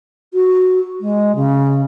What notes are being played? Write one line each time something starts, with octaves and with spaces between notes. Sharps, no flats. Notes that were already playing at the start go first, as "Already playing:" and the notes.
F#4
G#3
C#3